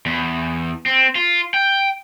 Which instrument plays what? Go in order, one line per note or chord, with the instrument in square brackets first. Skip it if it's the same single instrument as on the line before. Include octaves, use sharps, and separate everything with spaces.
[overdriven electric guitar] E2
C4
F4
G5